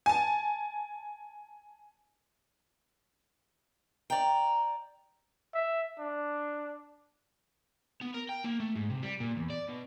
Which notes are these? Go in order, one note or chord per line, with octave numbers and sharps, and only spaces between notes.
G#5 A5
D5 G5 A#5
E5
D4
B3
A#4
G5
A#3
A3
G#2
C3
G3
A#2
E2
D5
B2